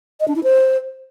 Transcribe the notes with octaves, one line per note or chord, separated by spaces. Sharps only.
D#5
D4
E4
C5